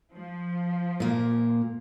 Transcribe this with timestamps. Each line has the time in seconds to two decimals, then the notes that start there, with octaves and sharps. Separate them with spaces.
0.13 F3
1.00 A#2 A#3